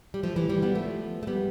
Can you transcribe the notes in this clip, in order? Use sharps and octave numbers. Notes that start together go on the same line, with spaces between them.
G3
F3 A3
E3 G3
E3 G3
G3 B3
F3 A3
A3
G3 B3